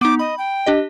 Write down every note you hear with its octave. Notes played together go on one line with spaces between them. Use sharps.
B3 D#4 D6
D#5 B5
G5
D4 G4 D#5